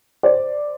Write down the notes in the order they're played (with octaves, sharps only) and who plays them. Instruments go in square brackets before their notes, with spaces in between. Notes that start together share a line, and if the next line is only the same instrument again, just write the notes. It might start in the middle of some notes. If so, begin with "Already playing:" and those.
[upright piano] C5 D5